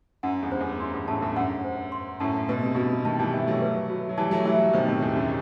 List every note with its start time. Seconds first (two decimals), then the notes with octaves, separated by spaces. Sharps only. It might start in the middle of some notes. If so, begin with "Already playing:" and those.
0.23 F#2 F#5
0.42 E2 G2
0.52 C5
0.61 E2
0.80 F#2 C6
0.94 E2 G2
1.08 F#2 A2 A5
1.18 F#2
1.22 E2 G2
1.36 F#2 F#5
1.64 C5
1.92 C6
2.20 F#2 A2 A5
2.49 B2 B4
2.62 C3
2.75 G2 B2 F#4
3.04 B2 D#3 A5
3.19 E3 G3
3.33 E3 G3 E5
3.47 F#3 A3
3.62 B4
3.90 F#4
4.09 F#3
4.18 E3 G3 A5
4.31 F#3 A3
4.45 E3 G3 E5
4.73 B2 D#3 C5
4.88 A2 C3
5.02 E2 G4
5.16 F#2